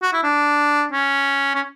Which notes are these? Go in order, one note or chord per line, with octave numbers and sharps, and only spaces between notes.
F#4
E4
D4
C#4
C#4